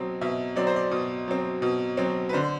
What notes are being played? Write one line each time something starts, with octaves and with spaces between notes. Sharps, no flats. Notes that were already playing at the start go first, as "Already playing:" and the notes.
Already playing: B2 F#3 C4
B2 E5
F#3 C4 D5
C5
D5
B2
F#3 C4
B2
F#3 C4
B4
D3 C5